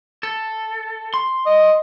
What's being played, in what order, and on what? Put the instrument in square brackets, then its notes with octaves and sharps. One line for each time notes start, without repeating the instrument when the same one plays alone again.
[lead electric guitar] A4
C6
[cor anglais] D#5